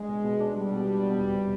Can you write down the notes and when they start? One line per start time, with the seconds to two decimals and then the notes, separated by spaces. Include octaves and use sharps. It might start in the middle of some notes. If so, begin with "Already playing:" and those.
Already playing: G#3 D4
0.09 B2
0.25 B2
0.41 D4
0.56 G3 G#3
0.72 B2
0.87 D4
1.03 B2
1.19 E2
1.34 C3